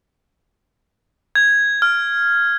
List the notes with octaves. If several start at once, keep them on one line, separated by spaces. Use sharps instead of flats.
G#6
F6